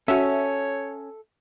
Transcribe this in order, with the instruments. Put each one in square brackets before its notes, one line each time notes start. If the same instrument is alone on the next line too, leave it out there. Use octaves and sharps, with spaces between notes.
[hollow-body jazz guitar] C#4 [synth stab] F#4 E5 [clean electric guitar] A4 [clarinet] C#5